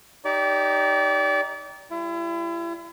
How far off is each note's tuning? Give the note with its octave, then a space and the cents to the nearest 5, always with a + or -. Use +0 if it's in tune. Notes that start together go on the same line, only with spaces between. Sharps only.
D#4 +0 G4 +0 D5 -30
G3 +0 E4 +40